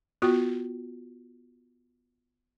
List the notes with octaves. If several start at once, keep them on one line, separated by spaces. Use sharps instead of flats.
B3 F4 F#4